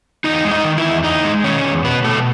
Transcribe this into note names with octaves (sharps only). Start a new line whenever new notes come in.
E2 D#4 D#5
G#3
D#4 D#5
D#3
E4 E5
E2
E2 D#4 D#5
G#3
D#3 C#4 C#5
E2
B2 B3 B4
B2 A3 A4